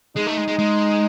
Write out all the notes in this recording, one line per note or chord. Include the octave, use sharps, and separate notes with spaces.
G#3 D#4
A3
G#3
G#3
G#3